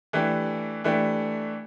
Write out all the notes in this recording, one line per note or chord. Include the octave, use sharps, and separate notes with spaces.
E3 A3 D4 G4
E3 A3 D4 G4